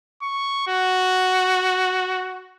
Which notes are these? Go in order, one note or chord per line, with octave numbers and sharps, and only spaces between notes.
C#6
F#4